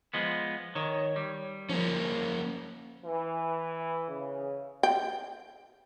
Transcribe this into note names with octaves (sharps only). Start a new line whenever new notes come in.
F3 G#3 B3
D#3 C#5
G3
F3 A#3 C#4
E3
C#3
G5